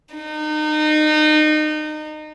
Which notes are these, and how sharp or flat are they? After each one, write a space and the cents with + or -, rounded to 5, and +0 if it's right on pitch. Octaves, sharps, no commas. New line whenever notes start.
D#4 -30